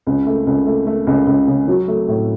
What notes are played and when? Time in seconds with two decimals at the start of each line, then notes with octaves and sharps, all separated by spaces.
0.07 C#2
0.27 A3
0.47 C#2
0.67 A3
0.87 A3
1.07 C#2
1.27 C#2
1.47 C#3
1.68 F#3
1.88 A3
2.08 A2